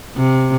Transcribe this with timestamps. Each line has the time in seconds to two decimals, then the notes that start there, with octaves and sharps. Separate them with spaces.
0.16 C3